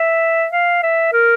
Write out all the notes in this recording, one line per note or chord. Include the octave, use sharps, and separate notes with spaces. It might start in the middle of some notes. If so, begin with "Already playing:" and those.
Already playing: E5
F5
E5
A#4